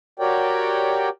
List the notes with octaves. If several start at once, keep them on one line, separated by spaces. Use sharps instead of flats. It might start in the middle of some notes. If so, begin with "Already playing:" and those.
F#4 G4 A#4 C#5 D5 G5